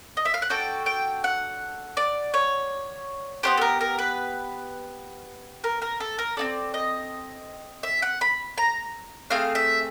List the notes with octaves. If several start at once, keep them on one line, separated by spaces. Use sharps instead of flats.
D#5
E5
F5
F#5
D4 F#4 A4 G5
G5
F#5
D5
C#5
B3 D4 G4 C5
A4
A#4
A#4
B4
A#4
A#4
A4
A#4
C4 E4 A4 D5
D#5
E5
F#5
B5
A#5
A3 C4 G#4 F5
E5